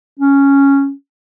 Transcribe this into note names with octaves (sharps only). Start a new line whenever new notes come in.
C#4